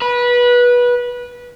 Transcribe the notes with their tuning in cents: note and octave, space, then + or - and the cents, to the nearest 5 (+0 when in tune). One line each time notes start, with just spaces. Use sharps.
B4 -20